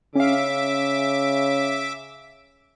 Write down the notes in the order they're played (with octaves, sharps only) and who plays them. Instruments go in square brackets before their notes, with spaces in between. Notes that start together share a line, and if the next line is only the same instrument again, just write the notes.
[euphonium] C#3 [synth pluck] C#4 F5 [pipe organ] E5 D6